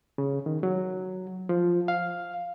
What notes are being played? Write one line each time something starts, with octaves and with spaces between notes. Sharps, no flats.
C#3
D#3
F#3
F3
F5